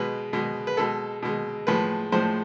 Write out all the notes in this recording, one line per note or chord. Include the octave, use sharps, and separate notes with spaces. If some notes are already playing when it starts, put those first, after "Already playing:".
Already playing: B2 G#3 B4
B2 G#3
B4
B2 G#3 A4
B2 G#3
A2 F3 G#3 B4
A2 F3 G#3 C5